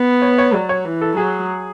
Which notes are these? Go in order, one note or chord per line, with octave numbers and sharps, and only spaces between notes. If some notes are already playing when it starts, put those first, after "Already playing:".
Already playing: B3
C#5
C#5
F#3 D5
C#5
E3
A4
F#3 G#4